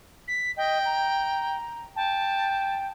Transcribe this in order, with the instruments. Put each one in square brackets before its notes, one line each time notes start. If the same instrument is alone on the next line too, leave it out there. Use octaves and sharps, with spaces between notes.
[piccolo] B6
[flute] D#5 [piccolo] G5
[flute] A#5
[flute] G5 [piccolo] A5